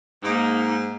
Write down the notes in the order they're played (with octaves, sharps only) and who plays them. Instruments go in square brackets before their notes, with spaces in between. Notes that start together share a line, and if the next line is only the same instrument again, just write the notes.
[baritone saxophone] G#2 [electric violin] A#3 D#4